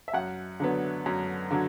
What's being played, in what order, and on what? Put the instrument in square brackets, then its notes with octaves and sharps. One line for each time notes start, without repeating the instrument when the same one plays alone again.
[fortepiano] E5
F#2 F#5
D3 F#3 B3
F#2
D3 F#3